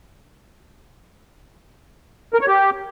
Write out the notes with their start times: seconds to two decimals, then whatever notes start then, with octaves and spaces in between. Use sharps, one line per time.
2.34 A#4
2.41 C#5
2.48 G4